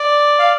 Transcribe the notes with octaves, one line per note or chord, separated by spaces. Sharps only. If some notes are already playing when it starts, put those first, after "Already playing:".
Already playing: D5
F5